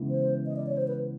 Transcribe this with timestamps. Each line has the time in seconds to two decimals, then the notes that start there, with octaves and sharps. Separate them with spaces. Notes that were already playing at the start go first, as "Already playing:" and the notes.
Already playing: C#3 E3 G#3 B3
0.09 C5
0.46 D#5
0.56 D5
0.66 C#5
0.77 C5
0.88 B4